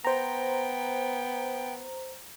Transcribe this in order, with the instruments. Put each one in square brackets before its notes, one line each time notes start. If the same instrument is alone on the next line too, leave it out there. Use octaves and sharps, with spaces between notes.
[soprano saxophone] B3 [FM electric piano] C5 A#5 [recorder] G5